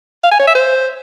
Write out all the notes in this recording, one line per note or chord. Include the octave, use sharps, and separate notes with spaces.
F5
G#5
C#5
E5
C5